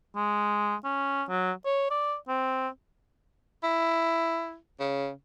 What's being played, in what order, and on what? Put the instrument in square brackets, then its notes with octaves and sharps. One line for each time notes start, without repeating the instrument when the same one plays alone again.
[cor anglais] G#3
C#4
F#3
C#5
D5
C4
[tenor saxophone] E4
C#3